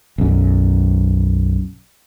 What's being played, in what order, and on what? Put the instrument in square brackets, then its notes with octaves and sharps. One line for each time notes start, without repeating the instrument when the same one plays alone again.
[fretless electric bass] B1 F#2